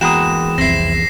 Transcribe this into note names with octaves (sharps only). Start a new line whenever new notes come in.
E2 G#3 A#3 F#4 G5 B5 D#6 E7
C2 F2 C4 E4 A#6 C7